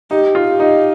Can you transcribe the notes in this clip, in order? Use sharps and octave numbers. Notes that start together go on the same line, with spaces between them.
D#4 G4
F4
G4
D#4